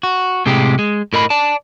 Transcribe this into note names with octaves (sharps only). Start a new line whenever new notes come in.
F#4
A2 C3 G#3 G4
G#3
A2 A#4 D#5 B5
D5 A5